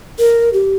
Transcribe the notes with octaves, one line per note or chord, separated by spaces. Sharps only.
A#4
G4